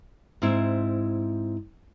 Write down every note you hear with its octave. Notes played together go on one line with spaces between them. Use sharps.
G#2 C4 E4